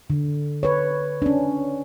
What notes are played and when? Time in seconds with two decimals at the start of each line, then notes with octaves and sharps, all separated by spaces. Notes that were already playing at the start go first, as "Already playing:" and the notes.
0.10 D3
0.63 B4 C#5
1.22 C#4 D4